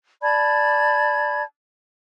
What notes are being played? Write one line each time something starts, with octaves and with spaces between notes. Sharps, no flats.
D5 A5 B5 G#6